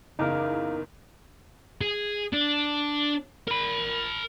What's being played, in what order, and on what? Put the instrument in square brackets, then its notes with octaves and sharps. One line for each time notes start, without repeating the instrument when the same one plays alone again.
[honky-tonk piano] F#1 E2 D6 [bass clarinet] C#3 [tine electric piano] D#4 A#4
[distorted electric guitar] G#4
D4
A#4 B5